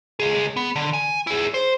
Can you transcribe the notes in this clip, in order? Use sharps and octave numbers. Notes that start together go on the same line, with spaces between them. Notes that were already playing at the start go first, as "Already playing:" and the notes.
C#2 G#4
B3
D3
G#5
E4 G#4
C5